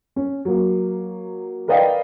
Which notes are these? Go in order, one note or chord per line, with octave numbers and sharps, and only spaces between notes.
C#4
F#3 A#3
A#4 B4 D5 D#5 F5 G5